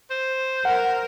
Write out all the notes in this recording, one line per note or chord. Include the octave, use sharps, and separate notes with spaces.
C5
A#4 F#5